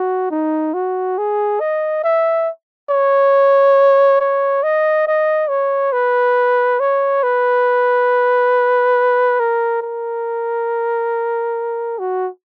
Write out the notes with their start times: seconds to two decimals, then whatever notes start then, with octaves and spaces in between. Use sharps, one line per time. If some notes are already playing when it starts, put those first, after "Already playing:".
Already playing: F#4
0.31 D#4
0.74 F#4
1.18 G#4
1.60 D#5
2.04 E5
2.90 C#5
4.21 C#5
4.63 D#5
5.07 D#5
5.49 C#5
5.92 B4
6.80 C#5
7.23 B4
9.40 A#4
9.82 A#4
11.99 F#4